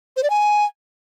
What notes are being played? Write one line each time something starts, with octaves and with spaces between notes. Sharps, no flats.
C5
D5
G#5